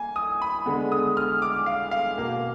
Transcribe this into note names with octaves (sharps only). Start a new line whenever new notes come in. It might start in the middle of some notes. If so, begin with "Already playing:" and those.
Already playing: A#3 G#5
D#6
B5
D3 G#3 B3
D#6
F6
D6
F5
F5
B2 A#3